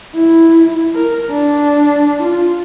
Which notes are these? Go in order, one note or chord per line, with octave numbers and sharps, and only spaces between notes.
E4
A#4
D4
F4